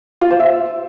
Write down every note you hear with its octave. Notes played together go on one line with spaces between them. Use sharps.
F4
C5
E5